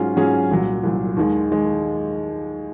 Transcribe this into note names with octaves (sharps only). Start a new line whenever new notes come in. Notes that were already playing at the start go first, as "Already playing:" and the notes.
Already playing: G#2 F#3 C#4 F4 G#4
G#2 F#3 C#4 F4 G#4
C2 A#2 F#3
C2 A#2 F#3
D#2 D#3 G#3
D#3 G#3